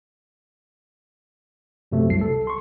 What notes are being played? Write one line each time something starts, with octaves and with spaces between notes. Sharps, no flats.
F#2 C3 F#3 A3
C2 C7
A4
C6 C#6